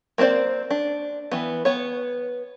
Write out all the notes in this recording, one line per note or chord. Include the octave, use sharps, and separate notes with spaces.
A#3 C4 D4 C5 D5
D4
E3 B3
B3 C#5